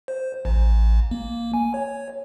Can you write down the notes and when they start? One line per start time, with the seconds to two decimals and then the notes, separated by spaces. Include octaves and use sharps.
0.08 C5
0.45 A1
1.11 A#3
1.54 G#5
1.74 C#5